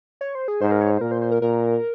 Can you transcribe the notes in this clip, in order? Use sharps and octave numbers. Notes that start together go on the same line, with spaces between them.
C#5
C5
G#4
G#2 C5
A#4
C#5
C5
A#2 A#4
C5
C5
A#4
A#2 A#4